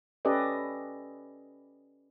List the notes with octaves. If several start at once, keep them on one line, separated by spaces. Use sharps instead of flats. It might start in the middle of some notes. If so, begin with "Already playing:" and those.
C#4 G4 A4 B4 D5 D#5